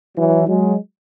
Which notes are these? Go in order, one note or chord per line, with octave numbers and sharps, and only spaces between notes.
E3 F#3
F#3 G#3